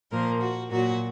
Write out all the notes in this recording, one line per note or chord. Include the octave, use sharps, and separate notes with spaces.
A#2 F3 A#3 A#4
F#4
A#2 F#3 A#3 F#4